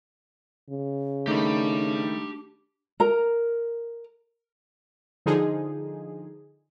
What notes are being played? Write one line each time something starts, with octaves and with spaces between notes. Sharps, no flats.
C#3
D#3 A3 D4 D#4 G4 B5
A#4 A#5
D3 F3 D#4 G#4